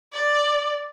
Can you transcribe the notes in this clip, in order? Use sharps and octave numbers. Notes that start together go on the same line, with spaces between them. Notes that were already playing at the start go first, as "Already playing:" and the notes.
D5